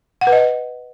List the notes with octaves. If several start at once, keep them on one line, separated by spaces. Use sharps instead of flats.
F#5
B4
D#5